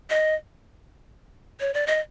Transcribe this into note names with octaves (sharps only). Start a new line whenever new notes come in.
D#5
C#5
D5
D#5